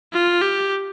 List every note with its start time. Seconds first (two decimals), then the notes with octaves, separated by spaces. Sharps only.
0.13 F4
0.42 G4